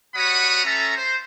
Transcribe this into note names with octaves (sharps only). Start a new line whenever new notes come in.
G3 F#4 C#5 F#5 B5 D#6
A3 C#4 A4 E5 A#5
C5